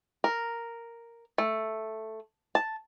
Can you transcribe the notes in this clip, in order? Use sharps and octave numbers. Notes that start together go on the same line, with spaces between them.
A#4
A3
A5